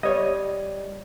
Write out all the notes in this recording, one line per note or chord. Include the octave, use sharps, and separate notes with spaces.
G3 C#5 D#5